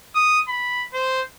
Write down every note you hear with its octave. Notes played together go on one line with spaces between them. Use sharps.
D#6
B5
C5